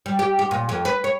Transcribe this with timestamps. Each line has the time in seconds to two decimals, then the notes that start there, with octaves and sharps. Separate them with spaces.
0.06 G3
0.19 G4
0.39 G4
0.51 A#2
0.69 F2
0.85 B4
1.04 C#5